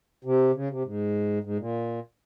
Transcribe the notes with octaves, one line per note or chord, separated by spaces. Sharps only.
C3
C#3
C3
G#2
G#2
A#2